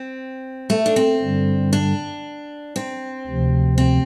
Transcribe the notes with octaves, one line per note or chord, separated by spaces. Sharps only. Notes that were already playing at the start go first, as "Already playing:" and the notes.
Already playing: C4
A3
D4
C4
G2 D3 G3
D4
C4
D2 C3 F3
C4